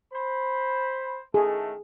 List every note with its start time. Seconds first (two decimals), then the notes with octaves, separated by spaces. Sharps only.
0.12 C5 B5
1.34 A2 D#3 A3 G#4